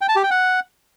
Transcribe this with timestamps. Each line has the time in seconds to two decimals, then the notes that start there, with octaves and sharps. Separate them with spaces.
0.01 G5
0.09 A5
0.16 G4
0.23 G5
0.31 F#5